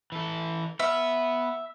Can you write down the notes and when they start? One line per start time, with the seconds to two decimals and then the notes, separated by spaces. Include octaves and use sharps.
0.12 E3 A4
0.79 B3 E5